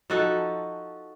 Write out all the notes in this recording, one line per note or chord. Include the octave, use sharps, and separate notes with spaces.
F3 D#4 F#4 A4